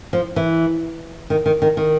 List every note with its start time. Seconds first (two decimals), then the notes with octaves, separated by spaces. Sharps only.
0.13 F3
0.36 E3
1.30 D#3
1.46 D#3
1.62 D#3
1.77 D#3